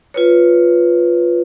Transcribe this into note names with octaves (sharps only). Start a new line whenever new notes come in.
F4 B4 C#5